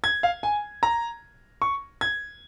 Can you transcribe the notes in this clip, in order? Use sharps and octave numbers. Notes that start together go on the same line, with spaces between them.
G#6
F5
G#5
A#5
C#6
G#6